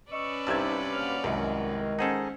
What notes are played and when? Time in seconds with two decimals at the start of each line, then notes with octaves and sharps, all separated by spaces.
0.11 C#4 B4 D5 D#5 C#6 E6
0.47 C2 G2 C3 D#4 G4 A5 E6 G#6
0.92 F#3 A#3 F6
1.24 C2 F#2 D#3 G#3
1.99 C#4 D#4 G#4 A4 C5 F#5